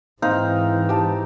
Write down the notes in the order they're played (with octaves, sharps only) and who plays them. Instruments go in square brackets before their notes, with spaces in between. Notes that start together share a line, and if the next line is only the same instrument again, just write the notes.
[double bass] G#2 E3 [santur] C4 D#4 F5
[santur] G4 A5